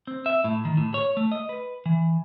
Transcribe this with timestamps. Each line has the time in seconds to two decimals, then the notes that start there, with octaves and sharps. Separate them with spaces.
0.07 C4
0.26 E5
0.44 A2
0.65 D#3
0.77 A2
0.94 C#5
1.17 A3
1.32 D#5
1.49 B4
1.86 E3